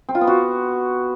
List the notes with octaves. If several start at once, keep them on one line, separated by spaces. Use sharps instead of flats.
C4
F4
B3
F#4